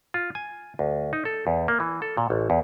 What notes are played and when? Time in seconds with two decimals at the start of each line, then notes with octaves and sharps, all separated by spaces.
0.14 F4
0.35 G#5
0.79 D2
1.13 D#4
1.25 A4
1.47 E2
1.68 A#3
1.80 E3
2.02 A4
2.17 A#2
2.30 A1
2.50 E2